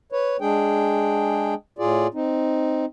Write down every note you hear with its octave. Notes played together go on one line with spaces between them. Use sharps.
B4 C#5
G#3 D4 G#4 G5
A2 F4 G#4 D5
C4 D#4